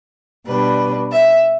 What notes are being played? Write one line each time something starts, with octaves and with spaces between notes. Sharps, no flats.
B2 G3 D4 B4
E5